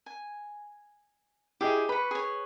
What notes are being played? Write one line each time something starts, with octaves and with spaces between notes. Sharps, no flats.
G#5
E4 G4 G#4 D#5
B4 B5 C#6
G#4 C#5